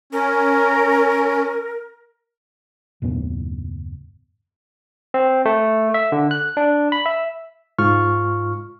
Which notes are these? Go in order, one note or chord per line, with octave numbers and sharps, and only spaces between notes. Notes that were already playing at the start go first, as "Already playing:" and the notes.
C#4 A#4
F#1 D#2 A2 B3
C4
A3
E5
D3
F#6
D4
B5
E5
G#2 F4 C#6 F6